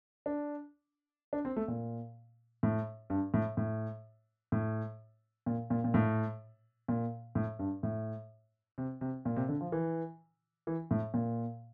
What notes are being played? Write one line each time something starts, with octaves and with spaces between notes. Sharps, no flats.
D4
D4
C4
A3
A#2
A2
G2
A2
A2
A2
A#2
A#2
A#2
A2
A#2
A2
G2
A2
C3
C3
A#2
C3
D3
F3
E3
E3
A2
A#2